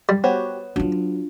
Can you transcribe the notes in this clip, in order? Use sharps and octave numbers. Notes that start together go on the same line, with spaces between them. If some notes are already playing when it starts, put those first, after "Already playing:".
G3
B3 F#4 G4 C5 C#5
F#3 D4 F4